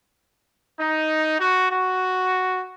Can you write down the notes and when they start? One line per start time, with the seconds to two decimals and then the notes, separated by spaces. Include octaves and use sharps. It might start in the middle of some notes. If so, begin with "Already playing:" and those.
0.80 D#4
1.39 F#4
1.71 F#4